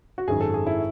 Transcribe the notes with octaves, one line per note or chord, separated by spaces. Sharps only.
F#4
G#1 F#2 D#3 G#4
A4
G#4
E4